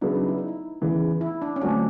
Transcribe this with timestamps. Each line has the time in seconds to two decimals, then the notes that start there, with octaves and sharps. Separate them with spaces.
0.01 C#3 F#3 B3 D4 E4
0.15 D#4
0.28 E4
0.38 D#4
0.48 E4
0.82 E2 C#3 E3
1.21 E4
1.42 D4
1.56 C#4
1.61 D3 F#3 A3 C4 D4 F4